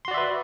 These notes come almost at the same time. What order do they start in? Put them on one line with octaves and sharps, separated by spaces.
C6 F#4 D5 E5 B4